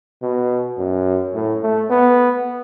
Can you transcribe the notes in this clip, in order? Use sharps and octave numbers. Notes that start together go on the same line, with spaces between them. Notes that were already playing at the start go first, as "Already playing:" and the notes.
B2
F#2
A2
A3
B3